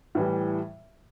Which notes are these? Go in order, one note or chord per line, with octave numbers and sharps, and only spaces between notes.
A2 E3 G3